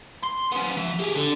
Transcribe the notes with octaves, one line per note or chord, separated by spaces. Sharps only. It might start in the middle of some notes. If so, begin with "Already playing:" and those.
C6
B3 C#4
F3 E5
G4 G#4
D3